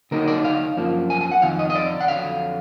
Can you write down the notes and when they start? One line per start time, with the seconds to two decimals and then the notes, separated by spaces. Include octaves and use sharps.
0.11 D3 F#3 A#3 D#4 A#4
0.28 D5
0.44 F5
0.77 F#2 F3 A#3 D4
1.10 G#5
1.21 G#5
1.32 F#5
1.42 F2 D#3 F5
1.59 D#5
1.70 D#5
1.75 D5
2.00 F#5
2.08 F2 D3 F#3 F5